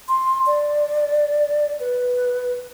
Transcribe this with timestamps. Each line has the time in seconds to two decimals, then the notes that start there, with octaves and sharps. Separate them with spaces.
0.09 C6
0.47 D5
1.80 B4